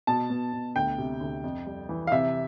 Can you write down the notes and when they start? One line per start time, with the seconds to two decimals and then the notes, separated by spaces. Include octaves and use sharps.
0.07 B2 A5
0.30 B2
0.53 B2
0.76 D2 G5
0.98 C3
1.21 D2
1.44 F2
1.66 G3
1.89 E3
2.07 F5
2.12 C3 E5